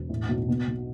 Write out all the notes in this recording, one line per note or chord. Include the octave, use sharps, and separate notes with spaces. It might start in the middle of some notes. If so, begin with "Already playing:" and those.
Already playing: E1
A2
B1
B2
B1